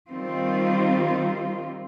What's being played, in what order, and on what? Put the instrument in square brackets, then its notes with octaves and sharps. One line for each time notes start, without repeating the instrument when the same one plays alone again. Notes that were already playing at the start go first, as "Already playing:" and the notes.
[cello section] D#3 G3 C4 F4